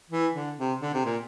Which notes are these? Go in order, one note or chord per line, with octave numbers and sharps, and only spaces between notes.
E3
D3
C3
D3
C3
A#2